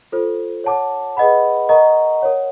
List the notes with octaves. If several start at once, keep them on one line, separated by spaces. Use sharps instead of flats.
F4 A4 C5
C#5 F#5 A5 D6
G#4 B4 D#5 F#5 B5
A#4 D#5 F#5 A#5 C#6
A#4 C#5 F#5